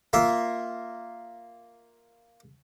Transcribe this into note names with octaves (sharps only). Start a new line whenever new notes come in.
A#3 F4 E5